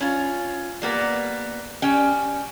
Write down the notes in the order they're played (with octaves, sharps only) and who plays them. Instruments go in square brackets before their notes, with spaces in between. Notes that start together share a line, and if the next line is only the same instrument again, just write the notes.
[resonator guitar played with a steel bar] C#4 F4
G3 A#3 B3
G3 C#4 G5